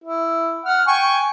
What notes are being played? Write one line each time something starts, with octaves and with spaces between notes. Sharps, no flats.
E4
F#5 F6
G5 G#5 C#6